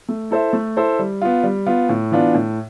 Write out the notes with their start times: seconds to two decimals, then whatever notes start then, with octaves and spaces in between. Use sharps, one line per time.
0.09 A3
0.31 E4 A4 C5 E5
0.53 A3
0.76 E4 A4 C5 E5
0.99 G3
1.22 B3 F4
1.43 G3
1.67 B3 F4
1.89 A2
2.11 E3 B3 D4 F4
2.34 A2